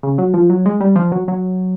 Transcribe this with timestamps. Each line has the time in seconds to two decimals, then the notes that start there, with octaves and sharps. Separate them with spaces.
0.03 C#3
0.18 F#3
0.34 F3
0.50 F#3
0.66 G#3
0.81 G3
0.96 F3
1.12 F#3
1.28 F#3